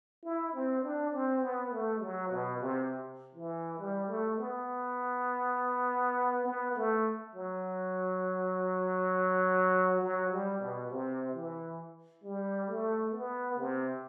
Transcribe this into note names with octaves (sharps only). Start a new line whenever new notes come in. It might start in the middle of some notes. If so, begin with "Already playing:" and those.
E4
C4
D4
C4
B3
A3
F#3
B2
C3
E3
G3
A3
B3
B3
A3
F#3
F#3
G3
B2
C3
E3
G3
A3
B3
C3